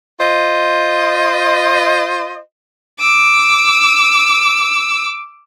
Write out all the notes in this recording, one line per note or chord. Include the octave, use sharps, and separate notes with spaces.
F4 C5 D#5
D6 E6